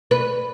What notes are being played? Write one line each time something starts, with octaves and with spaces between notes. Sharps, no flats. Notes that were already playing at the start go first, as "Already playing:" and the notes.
B4